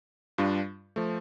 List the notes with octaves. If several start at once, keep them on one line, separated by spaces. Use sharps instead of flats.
G2 G3 D4 F4
F3 A3